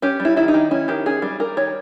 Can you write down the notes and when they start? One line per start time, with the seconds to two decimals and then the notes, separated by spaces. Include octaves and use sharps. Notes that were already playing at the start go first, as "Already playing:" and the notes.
0.02 C#4 G4
0.20 G3
0.25 E4
0.37 D#3 E4
0.48 D#4
0.54 D#3
0.71 C#4 E4
0.88 D#3 G4
1.06 C#4 G#4
1.22 G3
1.40 G3 A#4
1.57 D#3 C#5